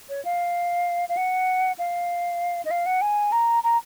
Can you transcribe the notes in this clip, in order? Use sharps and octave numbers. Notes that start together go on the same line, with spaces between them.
C#5
F5
F5
F#5
F5
D#5
F5
F#5
G#5
A#5
A#5